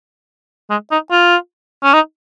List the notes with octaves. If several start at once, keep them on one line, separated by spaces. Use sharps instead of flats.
G#3
D#4
F4
C#4
D#4